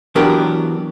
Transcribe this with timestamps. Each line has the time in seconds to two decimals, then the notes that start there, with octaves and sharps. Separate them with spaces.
0.15 E3 F#3 B3 D4 G4 A#4